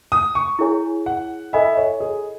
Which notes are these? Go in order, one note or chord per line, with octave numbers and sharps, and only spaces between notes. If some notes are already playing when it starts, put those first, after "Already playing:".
D#6
C#6
E4 G#4 C#5 G#5
F#5
A4 D#5 E5 G#5 B5
C#5
G#4